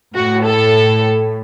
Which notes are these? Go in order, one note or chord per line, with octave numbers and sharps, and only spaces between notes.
A2 F#4
A4